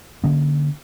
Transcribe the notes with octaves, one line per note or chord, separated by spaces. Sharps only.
D3 A#3 C#4